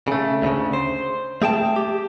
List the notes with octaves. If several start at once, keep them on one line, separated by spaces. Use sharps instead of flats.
C#3 A3
D2 A#2 C#3
C5
A3 G#4 G5 A5
G4